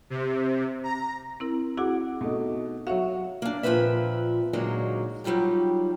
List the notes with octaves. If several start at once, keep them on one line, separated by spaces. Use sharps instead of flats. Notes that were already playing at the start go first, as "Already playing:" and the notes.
C3
A#5
C4 E4 A#4
E4 F#4 G#4 F#5 D6
B2 A3 D#4
F#3 F#4 C#5 E5 F5
A#3 D4
A#2 F3 A#3 C4 B4 E5
A#2 D3 F#3 G#3 A#3 D#4
F#3 G3 D#4 F4 G4